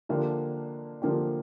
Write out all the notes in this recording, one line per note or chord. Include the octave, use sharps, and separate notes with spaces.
D3 F3 A#3 D4 G4
D3 F3 A#3 D4 G4